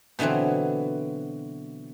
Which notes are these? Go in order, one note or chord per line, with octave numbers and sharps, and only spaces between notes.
B2 D3 E3 F#3 C4